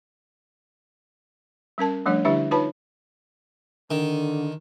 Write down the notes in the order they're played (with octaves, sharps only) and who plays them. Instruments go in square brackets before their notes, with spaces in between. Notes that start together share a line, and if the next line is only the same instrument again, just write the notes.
[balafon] G3 C#4 A#4 A5
F3 G3 A3 D4 C#5
D3 G3 D4 E4 G4 E5
D#4 F4 B4 C#5 A5 B5
[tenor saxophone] D3 [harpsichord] D#3